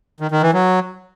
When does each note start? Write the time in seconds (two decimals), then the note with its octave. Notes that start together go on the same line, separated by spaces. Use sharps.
0.20 D#3
0.31 D#3
0.42 E3
0.53 F#3